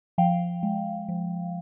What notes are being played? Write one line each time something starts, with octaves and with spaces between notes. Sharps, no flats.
F3 F5 G5
G#3
F3